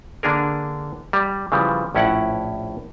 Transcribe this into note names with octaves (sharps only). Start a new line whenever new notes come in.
D3 A#3 D4 G#4 A#4
G3
C#3 E3 F3 G3
A#1 A2 C#4 E4 D5 F#5